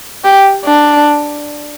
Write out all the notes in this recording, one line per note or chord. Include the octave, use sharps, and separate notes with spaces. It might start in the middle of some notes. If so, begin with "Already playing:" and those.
G4
D4